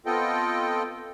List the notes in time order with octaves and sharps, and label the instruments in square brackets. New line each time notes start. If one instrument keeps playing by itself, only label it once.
[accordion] B3 C4 F4 A4 D#5 G5